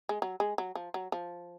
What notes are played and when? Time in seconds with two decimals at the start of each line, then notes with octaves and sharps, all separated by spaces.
0.09 G#3
0.22 F#3
0.40 G#3
0.58 F#3
0.75 F3
0.94 F#3
1.12 F3